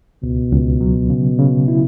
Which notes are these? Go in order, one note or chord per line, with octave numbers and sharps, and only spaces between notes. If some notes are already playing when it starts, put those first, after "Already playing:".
C#2 B2
C#2
F#3
C#3
C#3
E4